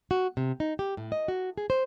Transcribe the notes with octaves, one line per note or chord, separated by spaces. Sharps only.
F#4
C3
D#4
G4
A2
D#5
F#4
G#4
C5